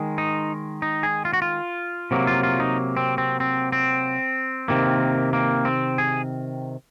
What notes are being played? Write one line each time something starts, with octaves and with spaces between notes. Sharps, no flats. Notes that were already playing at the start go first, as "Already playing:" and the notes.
Already playing: D#3 G#3
D#4
D#4
G#4
F4
F#4
F4
C3 F#3 A#3
F4
F4
D#4
C4
C4
C4
C4
C3 D#3 A#3
A#3
C4
G#4